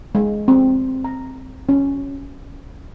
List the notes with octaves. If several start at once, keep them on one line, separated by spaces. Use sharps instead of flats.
G#3
C4
A#5
C#4